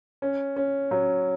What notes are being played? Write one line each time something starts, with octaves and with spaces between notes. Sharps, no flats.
C#4
C#4
F#3